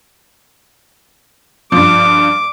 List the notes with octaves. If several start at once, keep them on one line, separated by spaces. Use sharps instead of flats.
G2 F3 D6